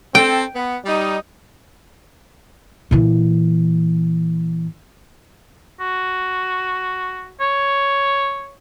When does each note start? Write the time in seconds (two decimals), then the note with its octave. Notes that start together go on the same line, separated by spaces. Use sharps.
0.15 C4 A4 G5
0.55 B3
0.85 G3 D#4
2.91 A#2 E3
5.80 F#4
7.40 C#5